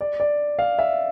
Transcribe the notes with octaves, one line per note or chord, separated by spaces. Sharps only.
D5
D5
F5
E5